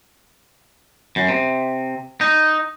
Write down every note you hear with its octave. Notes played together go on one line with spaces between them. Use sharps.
F#2
C3
D#4